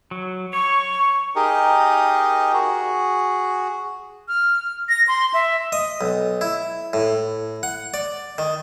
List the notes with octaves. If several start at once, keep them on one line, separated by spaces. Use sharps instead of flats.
F#3
C#5 C#6
D#4 G4 G#4 A#4 D#5
F#4 G#4
F6
A#6
C6
E5
D#5
B1
E4
A2
F#5
D5
D#3